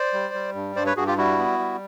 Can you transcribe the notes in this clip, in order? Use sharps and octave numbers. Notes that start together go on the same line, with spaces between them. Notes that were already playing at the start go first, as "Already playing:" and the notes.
Already playing: C5 D5
G3
G3
G2
G2 C5 D5
B4 C#5
G2 F#4 G#4
F4 G4
G3 E4 F#4
B3
G3